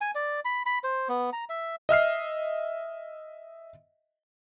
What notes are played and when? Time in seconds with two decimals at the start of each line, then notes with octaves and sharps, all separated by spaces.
0.01 G#5
0.15 D5
0.45 B5
0.66 B5
0.84 C5
1.09 B3
1.33 A#5
1.49 E5
1.89 D#5 E5 F6 C7